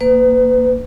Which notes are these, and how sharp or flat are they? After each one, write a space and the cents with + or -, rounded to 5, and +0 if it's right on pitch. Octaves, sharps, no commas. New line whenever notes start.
A#3 +0 B4 +35